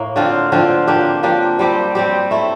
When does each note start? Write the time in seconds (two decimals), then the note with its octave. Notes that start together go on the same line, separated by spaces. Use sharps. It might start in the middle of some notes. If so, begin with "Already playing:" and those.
Already playing: A2 A#3
0.16 D3 F3 C4 F4
0.52 D3 F3 C4 F4
0.88 F3 A#3 D4 G4
1.23 F3 A#3 D4 G4
1.59 G3 C4 G4
1.95 G3 C4 G4
2.31 A3 E4 A4